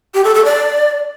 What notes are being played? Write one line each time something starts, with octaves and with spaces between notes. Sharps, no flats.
G4
A4
A4
D5